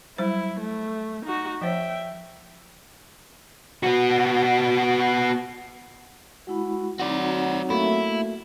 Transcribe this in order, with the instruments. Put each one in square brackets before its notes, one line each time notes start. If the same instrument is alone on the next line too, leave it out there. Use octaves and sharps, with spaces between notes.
[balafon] F#3 G3 C5 [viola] E4
[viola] A3
D#4 F#4
[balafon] F3 C5 C#5 [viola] E5 G5
[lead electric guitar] B3 F#4
[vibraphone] G#3 E4 B5 [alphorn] F#4
[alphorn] F#3 [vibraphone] C4 D#4 A#5 [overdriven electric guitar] F#4 D5
[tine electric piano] A3 A#3 F#4 [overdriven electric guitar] E4